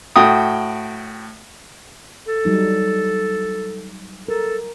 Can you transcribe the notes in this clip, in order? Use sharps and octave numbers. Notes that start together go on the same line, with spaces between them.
A2 F#4 G5 D#6
A4
F#3 G3 D#4
A4 A#4